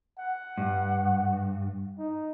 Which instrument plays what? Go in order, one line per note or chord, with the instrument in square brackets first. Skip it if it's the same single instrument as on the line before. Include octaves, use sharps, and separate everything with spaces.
[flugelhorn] F#5
[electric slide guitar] G2
[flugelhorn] D#4